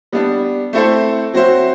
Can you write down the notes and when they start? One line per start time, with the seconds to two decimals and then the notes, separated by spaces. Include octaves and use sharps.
0.12 G3 B3 D4
0.73 A3 C4 E4 A4 C5
1.34 F#3 C4 F#4 C5 E5